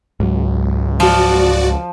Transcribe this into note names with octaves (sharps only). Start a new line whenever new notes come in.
C#2 G#2 F#3
F3 F#4 D5